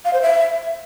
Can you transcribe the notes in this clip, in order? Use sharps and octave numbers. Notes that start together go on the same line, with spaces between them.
F5
C5
E5